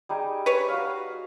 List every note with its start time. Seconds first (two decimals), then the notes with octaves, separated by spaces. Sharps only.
0.09 G3 D#4 G#4
0.46 B4 C#5
0.68 F#4 F5